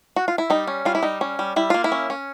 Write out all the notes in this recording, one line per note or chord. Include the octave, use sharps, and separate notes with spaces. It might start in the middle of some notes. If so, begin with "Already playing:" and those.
F#4
F4
E4
G3 D#4
C#4
G3 F4
E4
G3 D#4
C#4
G3
G3 E4
A#3 F4
E4
C#4
C#4